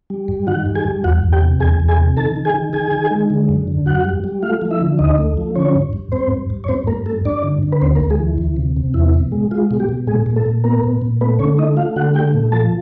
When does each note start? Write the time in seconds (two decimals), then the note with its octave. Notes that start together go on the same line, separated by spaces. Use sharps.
0.10 G3
0.28 G2
0.47 D#3 F#4 F#5
0.66 G3
0.75 G#4 G#5
0.85 G2
1.04 E2 F#4 F#5
1.23 E2
1.32 G4 G5
1.42 C3
1.60 E2 G#4 G#5
1.80 E2
1.88 G#4 G#5
1.98 C3
2.17 D#3 A4 A5
2.36 D#3
2.45 G#4 G#5
2.54 D#3
2.73 D#3 G#4 G#5
2.92 D#3
3.11 G#3
3.30 D3
3.49 F#2
3.67 D3
3.86 F#2 F#4 F#5
4.05 G3
4.24 G3
4.42 A3 F4 F5
4.62 F3
4.71 E4 E5
4.81 D3
4.99 D2 D#4 D#5
5.18 A3
5.37 F3
5.56 D3 C#4 C#5
5.75 G2
5.93 G2
6.12 G2 C4 C5
6.31 G2
6.50 G2
6.64 C#5
6.68 G2 C4 C5
6.87 G2 A#3 A#4
7.06 A3 A4
7.25 G2 D4 D5
7.44 D3
7.63 D3
7.72 B4
7.81 D2 C4 C5
7.95 A#3 A#4
8.00 D2
8.10 G#3 G#4
8.19 E3
8.38 D2
8.57 C3
8.77 C3
8.94 E2 E4
9.14 B2
9.32 G#3
9.51 G#3 F4
9.71 B2
9.80 G3 G4
9.89 B2
10.07 A#2 G#3 G#4
10.26 A#2
10.36 A3 A4
10.46 A#2
10.64 A#3 B3 A#4
10.83 A#2
11.02 A#2
11.21 A3 B3 B4
11.39 D3 C#4 C#5
11.58 A3 D#4 D#5
11.77 A3 F4 F5
11.96 D3 F#4 F#5
12.14 A3 G4 G5
12.34 A#2
12.52 F3 A4 A5